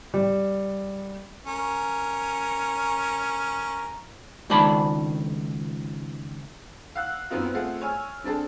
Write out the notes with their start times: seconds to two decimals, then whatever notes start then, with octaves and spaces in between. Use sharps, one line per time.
0.14 G3
1.47 C#4 A#4
4.50 C#2 D#3 G#3 D5 A5 B5
6.95 F5 F#5 E6 F#6
7.30 F#2 B3 C4 D#4 F4
7.54 A3 C4 F4 G#4 F5 F#5
7.81 C#5 G#5 E6 F6
8.24 C4 D4 G#4 A4